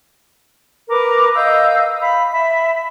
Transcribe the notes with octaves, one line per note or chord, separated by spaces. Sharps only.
A#4 B4 D6
D#5 F5 E6 G6
F5 B5
E5 B5